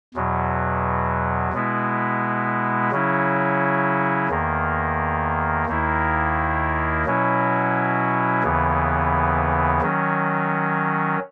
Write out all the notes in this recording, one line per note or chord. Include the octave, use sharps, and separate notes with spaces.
E2 B2 F#3
B2 G#3 B3 E4
C#3 F#3 C#4 E4
E2 D#3 A#3
D#2 D#3 A#3 E4
B2 F#3 C#4 E4
D#2 C#3 E3 B3
D#3 F#3 C#4